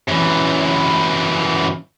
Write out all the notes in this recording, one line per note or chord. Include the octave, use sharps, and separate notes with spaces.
F#2 E3